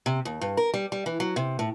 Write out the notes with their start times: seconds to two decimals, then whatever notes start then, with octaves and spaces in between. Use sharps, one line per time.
0.06 C3
0.25 D#2
0.41 G2
0.57 A#4
0.74 G3
0.92 G3
1.06 E3
1.20 F#3
1.36 C3
1.59 A2